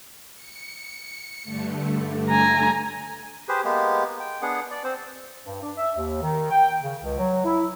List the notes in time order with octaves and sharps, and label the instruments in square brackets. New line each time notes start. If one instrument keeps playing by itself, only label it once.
[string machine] C#7
G2 D3 A3
[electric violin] G#5 A#5
[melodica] G4 G#4 B4 C5
G#3 A#3 B3 G4
G5
B3 D4 G#4 F#5
D5
C4 C5
[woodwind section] G2
D4
E5
D#2
D#3
G5
C#3
C#2
F#3
E4